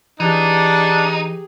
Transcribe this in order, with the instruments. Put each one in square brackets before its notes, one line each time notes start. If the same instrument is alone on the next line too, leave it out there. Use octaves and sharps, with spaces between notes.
[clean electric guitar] E3 [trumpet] D4 [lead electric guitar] D#4 [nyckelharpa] G4 G#4